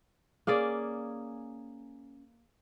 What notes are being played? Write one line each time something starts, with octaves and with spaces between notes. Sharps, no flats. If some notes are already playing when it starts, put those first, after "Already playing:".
A#3 C#4 G#4 D5